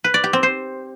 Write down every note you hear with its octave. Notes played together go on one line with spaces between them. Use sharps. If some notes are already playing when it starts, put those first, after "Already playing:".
B4
D5
G4
C4
C5